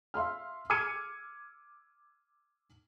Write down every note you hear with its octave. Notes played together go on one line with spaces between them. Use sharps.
E5 F5 C6 F6
D6 F6 G#6 C#7 D#7